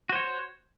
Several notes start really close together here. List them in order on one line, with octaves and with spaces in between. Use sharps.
F#4 C5 C#5